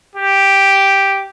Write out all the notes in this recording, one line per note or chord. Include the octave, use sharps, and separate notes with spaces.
G4